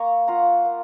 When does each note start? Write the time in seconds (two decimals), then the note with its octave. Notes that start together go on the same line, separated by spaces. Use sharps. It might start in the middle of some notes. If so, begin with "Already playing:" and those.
Already playing: A#3 A#5 C#6
0.28 F4 F#5 A#5
0.65 A#3